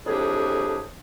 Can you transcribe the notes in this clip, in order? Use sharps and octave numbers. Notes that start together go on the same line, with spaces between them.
F2 A2 A#3 D4 G4 G#4